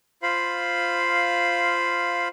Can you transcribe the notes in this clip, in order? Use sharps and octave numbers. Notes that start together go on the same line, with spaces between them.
F4 C5 F5 B5